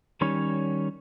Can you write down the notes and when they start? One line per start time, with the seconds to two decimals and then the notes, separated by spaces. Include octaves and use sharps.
0.21 D#3 G3 C#4 C#5